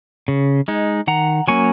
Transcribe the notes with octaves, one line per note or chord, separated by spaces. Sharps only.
C#3
G#3 D#4
D#3 F#5 A#5
F#3 A#3 C#4 G#5 C#6